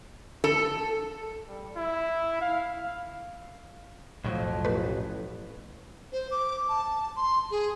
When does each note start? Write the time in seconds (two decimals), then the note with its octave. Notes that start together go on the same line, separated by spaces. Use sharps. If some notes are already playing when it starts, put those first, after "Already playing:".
0.44 A4
1.47 G3
1.76 E4
2.42 F5
4.24 B1 F2 A2 F3 F#3
4.65 A1 A3 B4
6.13 C5
6.31 D6
6.69 A5
7.16 C6
7.51 G#4